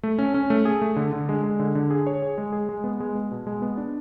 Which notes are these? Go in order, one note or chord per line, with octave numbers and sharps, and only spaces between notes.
A3
C#4
C#4
A3
G#4
A3
D3
D3
G#3
G#3
D3
D3
G#4
C#5
G#4
G#3
G#4
G#3
B3
G#3
B3
B2
G#3
B3
D4